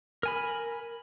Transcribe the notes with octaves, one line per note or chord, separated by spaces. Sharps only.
A#4 G#5 B5